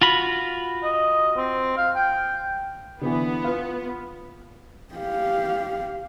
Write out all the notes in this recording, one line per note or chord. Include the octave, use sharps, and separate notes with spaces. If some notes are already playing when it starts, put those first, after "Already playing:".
F4 F#4 B5
D#5
C4
F5
G5
D3 E3 B3
F4 B4
G4 F5